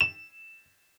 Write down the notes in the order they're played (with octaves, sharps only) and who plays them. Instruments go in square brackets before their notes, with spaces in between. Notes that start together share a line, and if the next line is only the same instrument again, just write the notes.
[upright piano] E7